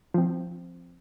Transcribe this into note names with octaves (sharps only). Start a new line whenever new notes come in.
F3 C4